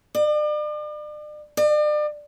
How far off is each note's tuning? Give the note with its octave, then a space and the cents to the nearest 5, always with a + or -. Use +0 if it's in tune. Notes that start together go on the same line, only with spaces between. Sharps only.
D5 +40
D5 +40